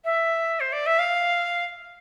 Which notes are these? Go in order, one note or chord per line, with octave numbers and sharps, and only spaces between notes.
E5
C5
D5
E5
F5